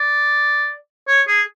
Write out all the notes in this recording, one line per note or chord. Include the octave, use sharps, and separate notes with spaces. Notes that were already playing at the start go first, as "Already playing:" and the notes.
Already playing: D5
C#5
G#4